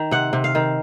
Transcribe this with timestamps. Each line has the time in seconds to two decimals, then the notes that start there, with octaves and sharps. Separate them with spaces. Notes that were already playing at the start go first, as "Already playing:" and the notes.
Already playing: D#3
0.11 C3 F#5
0.33 C3
0.44 F5
0.55 D#3